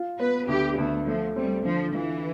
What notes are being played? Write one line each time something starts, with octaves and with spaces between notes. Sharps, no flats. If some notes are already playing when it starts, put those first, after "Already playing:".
Already playing: F4
B3 B4
D2 G4
D2 A3
F3 A3
G3 C4
D3 F3
E3 F4